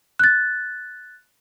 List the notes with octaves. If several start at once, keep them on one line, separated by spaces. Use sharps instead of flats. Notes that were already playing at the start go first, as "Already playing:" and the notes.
F#6 A6